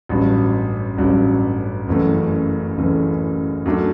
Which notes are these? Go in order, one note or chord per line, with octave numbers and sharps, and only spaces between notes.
A1 G2 F#3
A1 G2 F#3
F#1 F#2 E3 A3
F#1 F#2 E3 A3
F#2 F#3 A3 D4